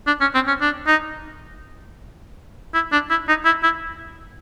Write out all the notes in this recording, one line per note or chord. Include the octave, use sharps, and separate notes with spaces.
D4
C#4
C4
C#4
D4
D#4
E4
D4
E4
D#4
E4
E4